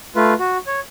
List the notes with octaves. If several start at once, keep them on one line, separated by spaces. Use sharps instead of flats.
A3 F4 B4
F#4
C#5